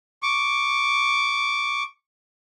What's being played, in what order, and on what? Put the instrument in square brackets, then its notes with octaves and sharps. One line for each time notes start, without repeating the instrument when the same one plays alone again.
[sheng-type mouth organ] C#6 D6